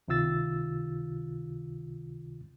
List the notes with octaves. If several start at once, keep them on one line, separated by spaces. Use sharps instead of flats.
C#2 C3 D#3 F4 E6 A6